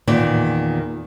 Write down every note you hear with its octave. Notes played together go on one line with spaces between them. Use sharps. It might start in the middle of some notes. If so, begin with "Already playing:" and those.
E2 A#2 D#3 D5